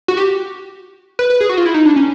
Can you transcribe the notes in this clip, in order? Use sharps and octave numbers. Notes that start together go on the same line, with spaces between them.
F#4
G4
B4
B4
G#4
F#4
F4
E4
D#4
D4
C#4